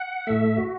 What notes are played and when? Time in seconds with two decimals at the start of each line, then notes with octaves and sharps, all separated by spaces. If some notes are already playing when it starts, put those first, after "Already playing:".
Already playing: F#5
0.27 A2 A3 E5
0.57 F#4